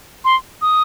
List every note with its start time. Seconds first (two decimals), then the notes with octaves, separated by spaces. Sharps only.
0.25 C6
0.62 D#6